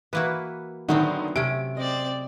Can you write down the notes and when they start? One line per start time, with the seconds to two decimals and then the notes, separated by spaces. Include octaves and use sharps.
0.13 E3 A#3 E4 F#4 B4
0.89 D3 D#3 F#3 A3 B3 C4 D#4
1.36 C3 A3 C#4 D7
1.77 C4 D5 D#5